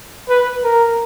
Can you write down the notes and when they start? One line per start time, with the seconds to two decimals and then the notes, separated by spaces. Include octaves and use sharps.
0.29 B4
0.64 A#4